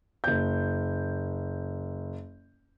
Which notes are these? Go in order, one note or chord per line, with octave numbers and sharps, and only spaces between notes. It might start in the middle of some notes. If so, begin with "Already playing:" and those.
F#1 G6